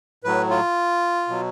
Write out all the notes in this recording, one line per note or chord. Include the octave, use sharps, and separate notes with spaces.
A2 F#3 B4
F4
B2 F#3